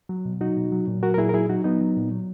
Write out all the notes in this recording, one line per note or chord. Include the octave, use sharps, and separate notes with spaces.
F#3
B2
F#3 D#4 F#4
B2
F#3
A#2
F#3 F#4 A#4
A#4
A#2 E4 G#4
A#4
F#3 E4 G#4
F#3 D#4 F#4
F#3 B3 D#4
F#3
A#2
F#3